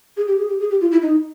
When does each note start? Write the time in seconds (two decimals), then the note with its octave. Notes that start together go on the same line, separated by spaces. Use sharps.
0.17 G#4
0.27 G4
0.38 G#4
0.49 G4
0.60 G#4
0.70 G4
0.81 F4
0.91 E4
1.02 D#4